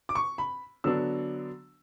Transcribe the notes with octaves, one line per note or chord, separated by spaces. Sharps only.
D6
C#6
B5
D3 F#3 B3 D4 E6